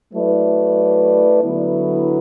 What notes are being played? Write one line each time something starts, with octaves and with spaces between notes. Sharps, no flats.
F#3 A3 E4 B4 D5
D3 F#3 B3 E4